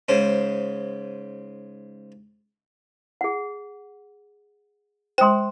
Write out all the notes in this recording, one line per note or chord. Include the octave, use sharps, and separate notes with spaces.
G#2 C#3 C5
G#4 F#5
G#3 C5 G5 C6